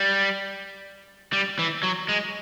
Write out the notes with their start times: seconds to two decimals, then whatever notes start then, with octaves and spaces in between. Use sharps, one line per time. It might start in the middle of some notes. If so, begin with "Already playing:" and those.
Already playing: G3
1.33 G3
1.59 E3
1.83 F#3
2.09 G#3